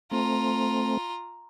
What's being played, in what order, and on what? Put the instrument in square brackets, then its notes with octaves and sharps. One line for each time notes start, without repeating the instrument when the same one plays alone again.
[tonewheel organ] A3 C4 [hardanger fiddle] F4 A#5